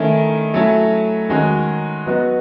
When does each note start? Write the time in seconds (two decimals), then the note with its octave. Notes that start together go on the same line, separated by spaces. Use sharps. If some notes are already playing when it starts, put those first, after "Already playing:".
Already playing: D#3 A3 C#4 E4
0.54 F#3 A3 C#4 E4
1.29 D#3 G#3 C#4 F#4
2.06 F#3 B3 D#4 F#4